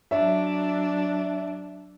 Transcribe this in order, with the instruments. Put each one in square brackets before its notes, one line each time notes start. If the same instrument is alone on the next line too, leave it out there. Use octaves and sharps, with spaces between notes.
[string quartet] F#3 D4 [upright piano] E5